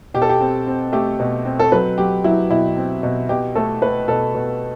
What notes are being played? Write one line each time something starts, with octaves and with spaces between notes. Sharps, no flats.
B2 G4
A4
G4
C4
C4
A3 G4
B2
C4
A4
F#3 B4
F#3 G4
F#3 E4
B2 E4
C4
B2
B2 G4
A3 A4
A3 B4
B2 A4
B2